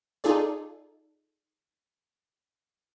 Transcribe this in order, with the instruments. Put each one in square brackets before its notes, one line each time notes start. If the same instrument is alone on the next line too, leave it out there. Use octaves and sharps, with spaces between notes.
[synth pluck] D#4 F4 G#4 A4 D5